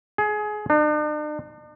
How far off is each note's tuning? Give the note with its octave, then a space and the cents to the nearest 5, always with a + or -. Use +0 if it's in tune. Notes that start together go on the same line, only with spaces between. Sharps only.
G#4 +25
D4 +45